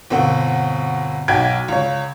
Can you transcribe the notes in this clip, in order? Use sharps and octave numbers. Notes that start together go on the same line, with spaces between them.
G1 B2 C4 F#5
B1 D#4 F#4 G5 G#6 D7
C#2 C#5